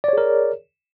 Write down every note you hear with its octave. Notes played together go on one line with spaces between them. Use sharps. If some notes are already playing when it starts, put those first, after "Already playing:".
G#4 A#4 C#5 D5